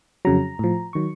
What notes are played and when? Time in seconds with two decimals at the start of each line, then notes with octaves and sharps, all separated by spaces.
0.25 F2 C#3 F#3 A#5
0.59 A2 F3
0.93 D#3 F#3 C#6